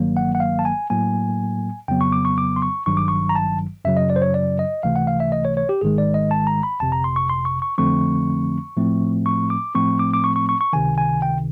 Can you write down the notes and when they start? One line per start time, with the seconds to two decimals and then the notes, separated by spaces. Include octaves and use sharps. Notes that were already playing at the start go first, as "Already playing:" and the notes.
Already playing: G1 G2 D#3 F#3 A#3
0.17 F#5
0.35 F#5
0.40 F5
0.59 A5
0.65 G#5
0.90 A2 F#3 A#3 G#5
1.88 F2 C#3 F#3 B3 G5
2.01 C#6
2.12 D6
2.25 C#6
2.38 D6
2.56 C6
2.62 C#6
2.86 G#1 G2 D#3 F#3 C#6
2.97 D6
3.08 C#6
3.29 A#5
3.35 A5
3.85 F#2 C#3 F#3 E5
3.97 D#5
4.10 D5
4.16 C5
4.22 C#5
4.34 D5
4.59 D#5
4.83 C#2 C3 E3 A3 F5
4.96 F#5
5.07 F5
5.20 E5
5.32 D#5
5.45 C#5
5.57 C#5
5.69 G4
5.81 G#1 G#2 D#3 G#3 G#4
5.98 D5
6.14 D#5
6.31 A5
6.47 A#5
6.63 B5
6.80 G1 F2 C3 A5
6.92 A#5
7.04 C6
7.16 C#6
7.29 C6
7.45 C#6
7.62 C#6
7.78 F2 D3 F3 A3 C4 C#6
8.77 A2 F3 A3 C4
9.26 C#6
9.50 D6
9.75 A2 F3 A3 C4 C#6
9.99 D6
10.14 D6
10.24 C#6
10.36 C#6
10.49 C#6
10.61 C#6
10.73 C#2 C3 D#3 G#5
10.98 G#5
11.22 G5